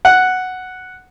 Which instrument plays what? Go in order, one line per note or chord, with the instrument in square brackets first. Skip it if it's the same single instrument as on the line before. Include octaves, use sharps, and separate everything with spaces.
[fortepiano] F#5